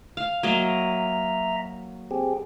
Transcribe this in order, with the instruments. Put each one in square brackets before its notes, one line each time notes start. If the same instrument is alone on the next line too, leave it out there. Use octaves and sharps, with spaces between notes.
[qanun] F5
[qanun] F#3 A#3 D#5 [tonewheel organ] E5 A#5
[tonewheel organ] C4 G4 G#4